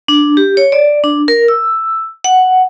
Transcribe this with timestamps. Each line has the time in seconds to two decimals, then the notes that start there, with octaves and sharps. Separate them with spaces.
0.08 D4
0.37 G4
0.57 C#5
0.72 D5
1.04 D4
1.28 A#4
1.48 E6
2.24 F#5